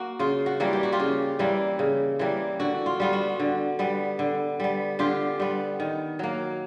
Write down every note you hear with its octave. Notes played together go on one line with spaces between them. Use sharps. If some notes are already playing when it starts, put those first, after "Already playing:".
Already playing: A#3 F#4
C#3 F4
F#4
E3 G3 A#3
G4
F#4
F4 G4
C#3
E3 G3 A#3
C#3
E3 G3 A#3
D3 F#4
F4
G3 B3 F4
F#4
D3
G3 B3
D3
G3 B3
D3 F4 G4
G3 B3
D#3
F#3 A#3